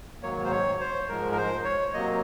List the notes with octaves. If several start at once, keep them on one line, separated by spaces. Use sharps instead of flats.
G#2 D#3 F#3 A#3 C#5
C5
C#5
C5
G#2 F3 G#3 A#4
A#4
C5
C#5
C3 F#3 A#3 D#5